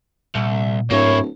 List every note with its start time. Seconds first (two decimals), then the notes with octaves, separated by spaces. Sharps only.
0.35 C2 A#2
0.91 D1 G#2 A#3 E4 C#5